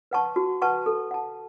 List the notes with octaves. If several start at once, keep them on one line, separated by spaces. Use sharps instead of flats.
B4 F#5 A5 C#6
F#4
B4 F#5 A5 C#6
A4
F#5 A5